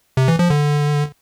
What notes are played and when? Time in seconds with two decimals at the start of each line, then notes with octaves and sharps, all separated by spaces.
0.17 C3
0.28 E3
0.39 F3
0.50 D3